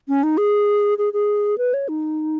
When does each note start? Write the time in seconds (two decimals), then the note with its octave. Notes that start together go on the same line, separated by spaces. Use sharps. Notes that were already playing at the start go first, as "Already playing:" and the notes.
0.08 C#4
0.23 D#4
0.38 G#4
0.98 G#4
1.13 G#4
1.58 B4
1.74 C#5
1.89 D#4